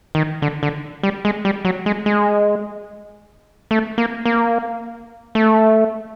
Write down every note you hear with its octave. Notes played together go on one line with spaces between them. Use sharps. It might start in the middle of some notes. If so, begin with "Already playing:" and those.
D#3
D3
D3
G3
G#3
G3
F#3
G#3
G#3
A3
A#3
A#3
A3